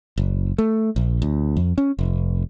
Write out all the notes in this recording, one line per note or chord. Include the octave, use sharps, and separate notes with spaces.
F#1
A3
A#1
D2
F2
C#4
F1